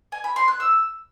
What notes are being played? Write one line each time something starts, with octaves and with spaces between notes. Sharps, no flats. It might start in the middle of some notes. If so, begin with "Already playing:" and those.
G#5
B5
C6
F#6
E6